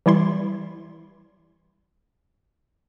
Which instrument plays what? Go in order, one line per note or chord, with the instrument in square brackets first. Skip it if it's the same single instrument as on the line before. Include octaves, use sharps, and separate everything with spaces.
[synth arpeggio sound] E3 G3 E4 C6